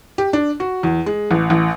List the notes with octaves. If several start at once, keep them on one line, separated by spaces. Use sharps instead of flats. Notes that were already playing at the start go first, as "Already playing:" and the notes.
G4
D4
F#4
E2
G#3
A1
A1